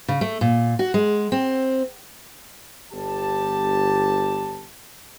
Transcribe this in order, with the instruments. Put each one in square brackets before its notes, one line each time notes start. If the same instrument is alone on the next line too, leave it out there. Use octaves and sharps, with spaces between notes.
[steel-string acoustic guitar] C#3
A3
A#2
F#4
G#3
C4
[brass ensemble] G1 G4 A5